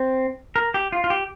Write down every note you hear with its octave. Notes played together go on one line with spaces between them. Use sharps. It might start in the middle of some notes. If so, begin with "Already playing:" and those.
Already playing: C4
A#4
G4
F4
F4
G4